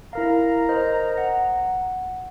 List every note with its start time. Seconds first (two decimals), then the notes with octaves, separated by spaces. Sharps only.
0.13 E4 A#4 F5 A#5
0.69 A#4 C5 D#5
1.18 F#5